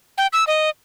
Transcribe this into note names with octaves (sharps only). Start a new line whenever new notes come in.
G5
E6
D#5